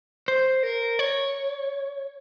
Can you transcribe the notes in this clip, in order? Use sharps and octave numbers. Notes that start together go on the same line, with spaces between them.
C5
A#4
C#5